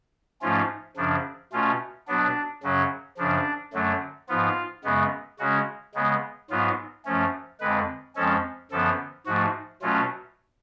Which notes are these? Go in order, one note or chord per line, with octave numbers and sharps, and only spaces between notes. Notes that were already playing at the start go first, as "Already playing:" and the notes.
G#2 F3 A3 C#4 F4
F#2 C#3 F3 D4
B2 A3 C#4 F4
B2 F#3 B3 D4
F#2 C#3 F#3 C#4
F#2 C#3 F3 D4
F#2 D3 F#3 A3
G#2 F3 B3 F4
F#2 C#3 G#3 B3
C#3 G#3 C#4 F#4
C#3 G#3 B3
G#2 F#3 B3 F4
F#2 F3 A3 C#4
F2 D3 G#3 B4
F2 F3 G#3 C#4 A4
F#2 D3 F3 B3 A4
G#2 F3 A3 F#4
B2 F#3 A3 C#4 F4